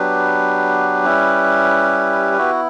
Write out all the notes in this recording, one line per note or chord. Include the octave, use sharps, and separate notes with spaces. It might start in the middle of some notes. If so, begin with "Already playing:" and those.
Already playing: F#3 B3 D4 G4 B4
G3 C#4 E4
B3 E4 F#4